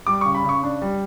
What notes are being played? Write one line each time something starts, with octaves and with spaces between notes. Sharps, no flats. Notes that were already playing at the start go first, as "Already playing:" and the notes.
G3 D6
C#3 C#6
B5
C#3 C#6
D4
G3